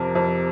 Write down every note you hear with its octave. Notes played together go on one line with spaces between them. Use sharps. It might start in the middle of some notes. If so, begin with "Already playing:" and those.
Already playing: F2 C3 A#4
F2